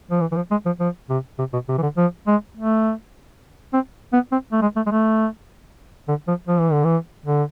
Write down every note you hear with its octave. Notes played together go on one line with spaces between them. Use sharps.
F3
E3
E3
F3
G#3
F3
F3
C3
C3
B2
C3
E3
D3
F3
G#3
A3
C4
B3
C4
A3
G#3
A3
G#3
A3
D3
F3
F3
E3
D3
E3
D3